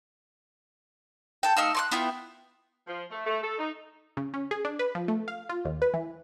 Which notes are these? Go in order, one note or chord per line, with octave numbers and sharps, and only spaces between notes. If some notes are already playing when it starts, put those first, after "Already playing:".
A4 G5
A3 D#4 F5 E6
C6 C#6 F#6
B3 E4 F4 G5
F3
A3
A3
A4
D#4
C#3
C#4
G#4
D4
B4
F3
A3
F5
F4
D#2
B4
E3